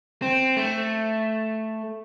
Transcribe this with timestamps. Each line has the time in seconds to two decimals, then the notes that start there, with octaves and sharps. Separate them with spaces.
0.22 C4
0.57 A3